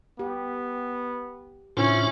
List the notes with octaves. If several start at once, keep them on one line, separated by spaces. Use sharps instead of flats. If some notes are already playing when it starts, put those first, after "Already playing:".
B3 G4
A2 C#3 C#4 D4 E4 F4 C5